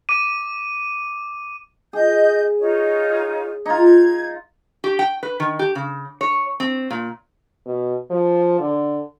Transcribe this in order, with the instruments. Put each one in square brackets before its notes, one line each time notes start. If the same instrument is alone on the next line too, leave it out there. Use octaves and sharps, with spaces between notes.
[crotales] D6 D#7
[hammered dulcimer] G#4 [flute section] D#5 G6
[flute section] D#4 F4 C#5
[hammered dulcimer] D#4 F4 [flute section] G#6
[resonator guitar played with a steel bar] G4
G5
B4
D#3
G4
C#3
C#5
C4
A#2
[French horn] B2
F3
D3